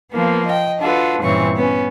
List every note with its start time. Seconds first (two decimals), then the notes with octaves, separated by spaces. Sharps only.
0.12 F3 A#3 B3
0.47 D#5 G5
0.80 D4 F4 F#4 A4 B4
1.22 G2 A#2 C#3 E3 C4 C#6
1.56 B3 C#4